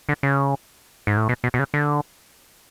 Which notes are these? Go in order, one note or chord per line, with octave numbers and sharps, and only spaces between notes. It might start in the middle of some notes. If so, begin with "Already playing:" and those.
D3
C#3
G#2
A2
B2
B2
B2
C#3
D3